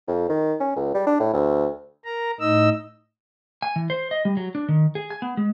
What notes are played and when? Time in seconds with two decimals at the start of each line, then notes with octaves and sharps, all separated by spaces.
0.08 F2
0.29 D#3
0.60 C#4
0.76 C#2
0.94 G3
1.07 D4
1.20 A2
1.34 D2
2.05 A#4 A#5
2.40 A2 D#4 D#5 E6
3.62 G#5
3.76 E3
3.90 C5
4.11 D#5
4.25 G3
4.37 F#3
4.55 D4
4.68 D#3
4.95 G#4
5.10 G#5
5.22 B3
5.37 G#3